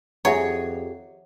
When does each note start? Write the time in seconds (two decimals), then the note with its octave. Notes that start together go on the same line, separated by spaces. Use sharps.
0.25 F2 G4 G#4 C#5 E5 F#5 A#5